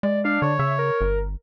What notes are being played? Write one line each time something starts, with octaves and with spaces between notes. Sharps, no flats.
G#3 D5
D4 F5
D3 C#5
C#3 E5
A#4
G1